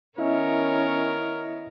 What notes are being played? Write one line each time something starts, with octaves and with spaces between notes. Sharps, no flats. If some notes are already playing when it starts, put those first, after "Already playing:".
D#3 B3 C#4 E4 A#4 C#5 D#5 E5